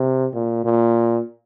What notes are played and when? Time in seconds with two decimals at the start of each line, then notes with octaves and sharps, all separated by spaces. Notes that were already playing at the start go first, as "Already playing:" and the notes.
Already playing: C3
0.34 A#2
0.65 A#2